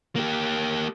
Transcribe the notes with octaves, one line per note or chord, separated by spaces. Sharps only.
A#3 G4